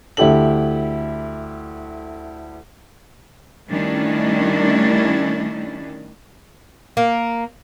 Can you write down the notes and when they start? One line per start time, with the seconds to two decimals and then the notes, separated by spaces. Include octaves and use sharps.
0.17 D2 E4 G4 A4 F#7
3.70 D#3 G3 A3 C#4 D4 E4
6.97 A#3